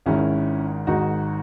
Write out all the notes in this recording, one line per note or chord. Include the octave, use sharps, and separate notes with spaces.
G#1 G#2 D#3 C#4 E4
G#1 G#2 D#3 D#4 F#4